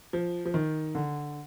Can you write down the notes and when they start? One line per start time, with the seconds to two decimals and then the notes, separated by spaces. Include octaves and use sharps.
0.13 F3
0.45 F3
0.54 D#3
0.95 D3